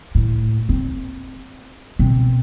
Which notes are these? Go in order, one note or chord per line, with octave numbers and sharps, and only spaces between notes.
A2
C4
B2 C4